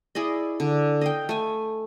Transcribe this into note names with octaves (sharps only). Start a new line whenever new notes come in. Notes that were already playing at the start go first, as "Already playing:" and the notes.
E4 G#4 D5 D#5
D3
D#5 F5 G5
A3 G#5